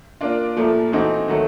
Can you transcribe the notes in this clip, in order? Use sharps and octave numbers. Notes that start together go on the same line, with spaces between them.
A#3 D4 F4
A#2 F3 A3
E3 A3 C4 D#4 F#4
D#3 F#3 A3